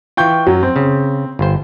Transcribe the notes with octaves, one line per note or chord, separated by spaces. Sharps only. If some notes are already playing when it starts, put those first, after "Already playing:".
E3 F4 G5 C#6 G6
F#2 F#3
C4
C#3
G1 C5